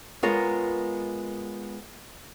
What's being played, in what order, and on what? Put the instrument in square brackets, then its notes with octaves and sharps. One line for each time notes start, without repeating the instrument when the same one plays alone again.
[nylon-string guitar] G#3 B3 F4 A#4 C#5